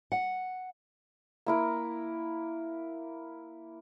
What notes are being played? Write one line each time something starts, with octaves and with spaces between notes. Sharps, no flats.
F#5
A#3 E4 A#4